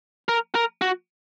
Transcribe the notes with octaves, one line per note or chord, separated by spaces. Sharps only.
A#4
A#4
F#4